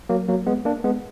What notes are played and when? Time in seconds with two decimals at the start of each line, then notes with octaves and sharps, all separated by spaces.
0.09 F#3 A#3
0.28 F#3 A#3
0.46 G#3 B3
0.65 A#3 D4
0.84 G#3 B3